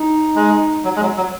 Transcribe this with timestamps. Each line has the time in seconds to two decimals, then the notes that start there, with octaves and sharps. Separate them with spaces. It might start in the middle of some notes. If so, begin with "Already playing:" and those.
Already playing: D#4
0.35 G#3
0.84 F#3
0.96 G#3
1.02 F#3
1.17 F#3